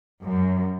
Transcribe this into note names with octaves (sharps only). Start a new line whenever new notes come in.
F#2